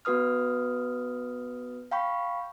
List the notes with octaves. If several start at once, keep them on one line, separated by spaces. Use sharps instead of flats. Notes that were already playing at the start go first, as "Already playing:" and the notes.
B3 F#4 B4 D#6 F6
F5 G5 B5 C#6